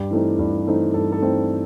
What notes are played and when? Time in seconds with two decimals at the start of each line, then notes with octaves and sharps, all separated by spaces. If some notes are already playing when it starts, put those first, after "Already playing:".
Already playing: G2 G4
0.11 E3 A3 C4 D#4
0.39 G2
0.67 E3 A3 C4 D#4
0.94 G2 A4
1.12 A4
1.22 E3 A3 C4 D#4